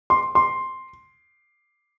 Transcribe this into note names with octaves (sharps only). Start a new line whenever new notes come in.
C6
C6